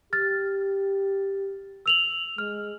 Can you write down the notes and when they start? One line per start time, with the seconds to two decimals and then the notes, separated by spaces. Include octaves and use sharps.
0.13 G4 F6 A6
1.86 E6 F7 F#7
2.38 G#3 F6